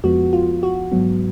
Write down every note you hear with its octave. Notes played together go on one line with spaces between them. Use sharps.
F2 F3 G#3 B3 F#4
F4
F#4
G#2 F#3 B3